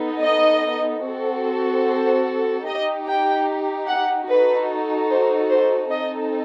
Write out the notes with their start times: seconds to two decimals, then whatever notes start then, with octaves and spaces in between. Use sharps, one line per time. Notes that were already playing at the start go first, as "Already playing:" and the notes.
Already playing: B3 D#4 A4
0.23 D#5
1.04 C4 F#4 A4
1.85 C5
2.66 D#4 G4 D#5
3.07 G5
3.88 F#5
4.29 D#4 F#4 A4 B4
5.10 C5
5.50 C5
5.91 C4 D#4 A4 D#5